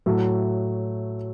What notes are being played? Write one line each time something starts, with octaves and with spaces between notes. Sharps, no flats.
A2 F#3 A3